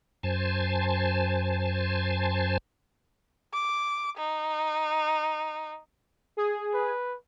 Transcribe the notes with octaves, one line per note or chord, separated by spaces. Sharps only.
F#2 C5 G#5 A5
D6
D#4
G#4
B4